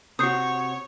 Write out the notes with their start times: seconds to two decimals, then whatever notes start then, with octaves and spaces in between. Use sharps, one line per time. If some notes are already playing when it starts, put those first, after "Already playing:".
0.19 C3 F#4 C#5 D#6 G6 C7